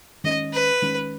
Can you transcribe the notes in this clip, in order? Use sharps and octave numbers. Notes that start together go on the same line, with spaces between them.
D#3 G#3 C#4 D#5
B4
D#3 G#3 C#4